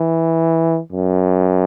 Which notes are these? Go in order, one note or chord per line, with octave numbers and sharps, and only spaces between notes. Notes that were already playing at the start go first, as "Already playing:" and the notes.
Already playing: E3
F#2